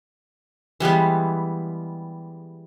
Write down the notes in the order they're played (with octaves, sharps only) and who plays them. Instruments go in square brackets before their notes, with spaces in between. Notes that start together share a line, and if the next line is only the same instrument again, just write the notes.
[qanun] E3 G3 G#3 B3